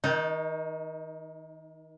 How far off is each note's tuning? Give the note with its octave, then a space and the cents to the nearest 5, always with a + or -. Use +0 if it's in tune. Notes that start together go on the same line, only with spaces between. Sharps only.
D#3 +35 D#4 -5